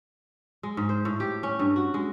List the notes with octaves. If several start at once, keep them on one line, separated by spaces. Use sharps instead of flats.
G#3
G#2
C5
A2
G4
C#4
G2
F#4
G#3